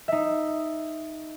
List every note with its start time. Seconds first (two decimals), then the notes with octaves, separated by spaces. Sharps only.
0.08 D#4 E5